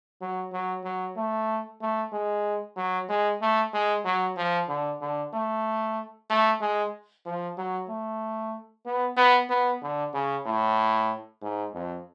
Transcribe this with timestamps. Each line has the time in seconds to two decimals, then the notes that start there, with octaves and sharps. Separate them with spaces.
0.21 F#3
0.52 F#3
0.84 F#3
1.16 A3
1.81 A3
2.12 G#3
2.76 F#3
3.10 G#3
3.42 A3
3.74 G#3
4.05 F#3
4.37 F3
4.68 D3
5.01 D3
5.33 A3
6.30 A3
6.61 G#3
7.26 F3
7.58 F#3
7.89 A3
8.85 B3
9.17 B3
9.50 B3
9.82 D3
10.14 C#3
10.45 A2
11.42 G#2
11.74 F2